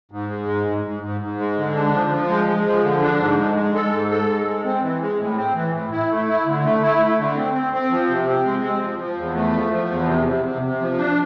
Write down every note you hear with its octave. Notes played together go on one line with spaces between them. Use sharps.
G#2
G#3
G#2
G#2
G#2
G#2
G#2
G#3
D3
D4
F3
F3
G#3
G#3
F3
D3
D4
G#2
G#3
G#3
A4
G#2
A4
G#3
G#3
C4
E3
G#3
A2
C4
E3
A2
E4
A3
E4
D3
A3
E4
A3
D3
C4
C4
C4
F3
C3
C4
G#3
C4
F3
F3
E2
A3
F3
F3
E2
C3
C3
C3
C3
F3
D4